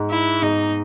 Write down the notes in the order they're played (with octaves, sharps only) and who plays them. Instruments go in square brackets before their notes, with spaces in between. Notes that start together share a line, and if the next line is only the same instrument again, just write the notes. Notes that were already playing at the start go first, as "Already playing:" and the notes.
Already playing: [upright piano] G#2
[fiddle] E4
[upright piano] G#2 [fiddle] D#4